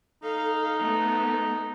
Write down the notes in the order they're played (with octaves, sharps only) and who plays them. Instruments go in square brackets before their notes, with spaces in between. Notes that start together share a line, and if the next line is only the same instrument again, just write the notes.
[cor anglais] D#4 [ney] A4 [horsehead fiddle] F5
[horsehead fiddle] A3 B3 [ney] A4